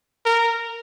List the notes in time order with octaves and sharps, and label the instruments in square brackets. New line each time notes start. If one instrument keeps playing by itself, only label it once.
[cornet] A#4